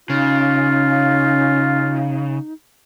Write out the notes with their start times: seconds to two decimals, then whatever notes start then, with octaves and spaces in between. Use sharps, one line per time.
0.10 C#3 C#4 D#4 F4 F5